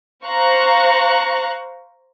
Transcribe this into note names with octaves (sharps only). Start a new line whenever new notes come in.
C5 F5 A#5 C#6 F#6